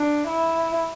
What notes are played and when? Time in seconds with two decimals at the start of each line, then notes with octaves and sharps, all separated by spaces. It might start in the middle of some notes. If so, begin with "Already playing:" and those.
Already playing: D4
0.28 E4